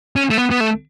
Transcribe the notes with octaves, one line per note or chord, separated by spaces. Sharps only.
C#4
A3
B3
B3
A3